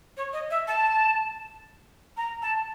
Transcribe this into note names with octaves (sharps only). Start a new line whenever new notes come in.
C#5
D#5
E5
A5
A#5
A5